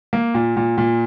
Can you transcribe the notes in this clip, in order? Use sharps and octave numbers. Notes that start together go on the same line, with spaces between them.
A#3
A#2
A#2
A#2